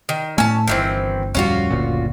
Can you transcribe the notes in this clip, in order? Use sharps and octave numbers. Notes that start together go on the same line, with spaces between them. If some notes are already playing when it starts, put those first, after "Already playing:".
D#3
A2 A3 C#4 A5
G1 D#3 E3 C4
D1 F2 G3 C#4 F4 F#4
F#1 D2 A#2